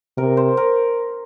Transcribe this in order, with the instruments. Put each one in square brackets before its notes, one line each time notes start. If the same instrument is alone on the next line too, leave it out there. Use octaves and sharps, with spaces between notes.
[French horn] C3 [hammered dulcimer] A#4
[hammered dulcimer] C5
A#4